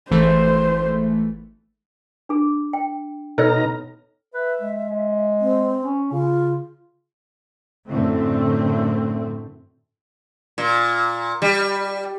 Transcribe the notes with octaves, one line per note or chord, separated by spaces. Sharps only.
G#1 E3 A3 C5
D4 G#4
G5
B2 D#4 A4 C#5 A#5 F6
B4 E5
G#3
G#3
C4
C#4
C#3 F4
F#2 A2 D3 A3 C4
A#2
G3